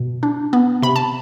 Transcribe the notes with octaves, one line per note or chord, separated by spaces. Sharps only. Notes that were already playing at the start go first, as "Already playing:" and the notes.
Already playing: B2
D4
B3
C3 B5
A5